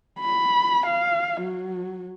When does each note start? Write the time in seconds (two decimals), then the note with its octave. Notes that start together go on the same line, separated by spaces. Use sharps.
0.20 B5
0.86 F5
1.41 F#3